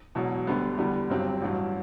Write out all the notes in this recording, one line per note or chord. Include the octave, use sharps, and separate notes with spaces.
E1 E2 B2 F#3
D2 D3 G3 B3
E2 D3 G3 B3
G1 G2 F#3 C4 G4
A1 G2 F#3